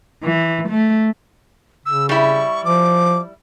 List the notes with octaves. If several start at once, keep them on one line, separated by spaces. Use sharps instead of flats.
E3
A3
C#3 E6
G3 E4 C#6
F3 D6